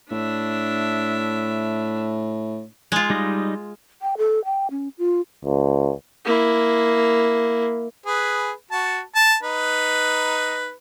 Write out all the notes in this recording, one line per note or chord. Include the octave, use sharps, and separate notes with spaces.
A2 D4 E5
G#3 F4
G3 D#4 D#5
G5
A4
G5
C#4
F4
C#2
A#3 E4
G#4 B4
F#4 A5
A5
D#4 B4